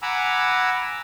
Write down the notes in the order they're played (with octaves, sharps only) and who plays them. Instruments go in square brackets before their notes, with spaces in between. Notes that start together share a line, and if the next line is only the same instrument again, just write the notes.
[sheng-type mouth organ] F#5 G#5 A#5 B5 D6 E6